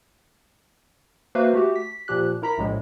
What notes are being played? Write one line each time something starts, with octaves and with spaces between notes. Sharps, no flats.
A#3 F#4 B4 C5 E5 F5
A3 F#4 G4
B6
A#2 F3 G4 F#6
E4 A#4 A#5 B5 B6
A#1 A2 G#3